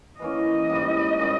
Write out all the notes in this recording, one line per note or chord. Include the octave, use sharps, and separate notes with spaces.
E3 A#3 C#4 D#5
G#2 G3 A#3 E4
A#2 G3 A#3 C#4